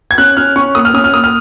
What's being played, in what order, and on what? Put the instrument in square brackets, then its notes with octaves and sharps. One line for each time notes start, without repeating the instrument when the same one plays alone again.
[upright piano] G#6
C#4 F#6
C#4 F6
C#4 C#6
A#3 D#6
F6
C#4 D#6
F6
A#3 D#6
F6